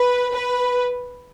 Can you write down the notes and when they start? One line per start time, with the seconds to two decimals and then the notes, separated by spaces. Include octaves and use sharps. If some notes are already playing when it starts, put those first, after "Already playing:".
Already playing: B4
0.33 B4